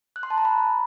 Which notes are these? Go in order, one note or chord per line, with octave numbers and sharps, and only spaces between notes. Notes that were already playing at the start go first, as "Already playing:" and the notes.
F#6
C6
A5
A#5
B5